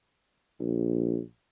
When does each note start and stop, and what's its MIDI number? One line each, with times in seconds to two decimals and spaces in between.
0.60 1.19 34